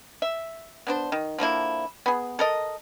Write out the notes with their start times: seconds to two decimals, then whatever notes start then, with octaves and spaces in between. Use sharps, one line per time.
0.22 E5
0.87 B3 D4 C5
1.12 D#3
1.38 D3 F3 A#3 E4
2.06 B3 G#4
2.39 A4 A#4 D#5